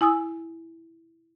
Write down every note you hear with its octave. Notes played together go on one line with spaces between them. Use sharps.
E4 G#5 D#6 E6